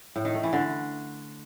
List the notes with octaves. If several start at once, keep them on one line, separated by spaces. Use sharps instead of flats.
A2
D#3
A3
E3
D3